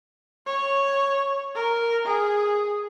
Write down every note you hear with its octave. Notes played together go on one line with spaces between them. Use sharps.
C#5
A#4
G#4